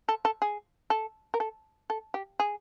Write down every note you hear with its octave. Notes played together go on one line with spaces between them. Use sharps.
A4
A4
G#4
A4
A#4
A4
A4
G4
G#4